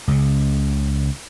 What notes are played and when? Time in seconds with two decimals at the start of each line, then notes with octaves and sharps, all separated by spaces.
0.08 C#2 C#3